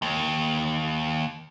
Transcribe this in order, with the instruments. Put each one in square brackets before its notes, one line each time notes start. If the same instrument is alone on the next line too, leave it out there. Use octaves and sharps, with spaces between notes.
[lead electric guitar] D#2